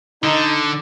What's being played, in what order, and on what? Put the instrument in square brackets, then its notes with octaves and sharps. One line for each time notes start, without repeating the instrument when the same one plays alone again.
[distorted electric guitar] D3 [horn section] D#4